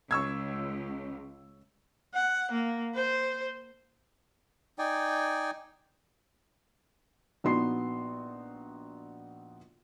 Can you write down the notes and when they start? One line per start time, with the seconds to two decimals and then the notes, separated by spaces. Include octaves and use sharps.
0.11 C#2 C#6 E6 G#6
2.14 F#5
2.52 A#3
2.95 C5
4.79 D#4 D5 G5 G#5
7.44 A#1 B3 D#4 F#4 C6 C7